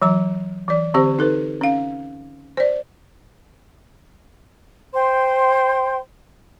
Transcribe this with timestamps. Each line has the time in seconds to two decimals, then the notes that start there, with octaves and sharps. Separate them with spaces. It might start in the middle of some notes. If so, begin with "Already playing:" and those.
0.02 E3 F#3 A#5
0.68 E3 D5
0.94 D3 C4 G4 C5
1.19 D#4 A4 B4
1.61 C#4 F5
2.57 C5 D5
4.94 C5 G5 C6